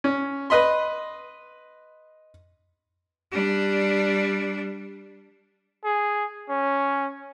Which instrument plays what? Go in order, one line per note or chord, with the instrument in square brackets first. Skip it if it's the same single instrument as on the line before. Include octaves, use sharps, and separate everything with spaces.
[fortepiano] C#4
B4 D#5 B5 C6
[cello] G3 D4
[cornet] G#4
C#4